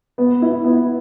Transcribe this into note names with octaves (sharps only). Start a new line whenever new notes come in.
B3
E4
B3